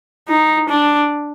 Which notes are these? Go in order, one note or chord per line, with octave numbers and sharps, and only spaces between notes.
D#4
D4